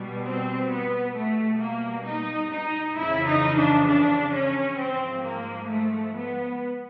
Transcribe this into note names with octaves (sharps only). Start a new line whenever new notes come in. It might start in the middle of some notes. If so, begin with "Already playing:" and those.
Already playing: B2 G3
C4
B3
B2 G3 A3
A#3
D#4
D#4
F2 C#3 E3 E4
D#4
D4
D4
C#4
G#2 F3 G#3 C4
A#3
A3
B3